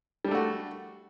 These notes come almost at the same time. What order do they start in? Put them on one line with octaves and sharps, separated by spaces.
G3 D4 A3 F#4